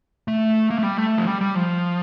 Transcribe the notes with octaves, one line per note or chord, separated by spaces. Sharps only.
A3
A#3
A3
G3
A3
F3
G3
G3
F3